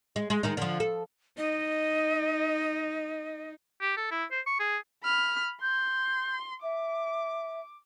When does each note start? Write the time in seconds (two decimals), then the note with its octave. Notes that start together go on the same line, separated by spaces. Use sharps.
0.16 G#3
0.30 G#3
0.43 D#3 G#3 D#4
0.57 D3 F3
0.80 A4
1.38 D#4 D#5
3.81 G4
3.97 A4
4.11 E4
4.31 C5
4.46 C#6
4.60 G#4
5.04 B5 F6
5.62 C6 G6
6.63 E5 D6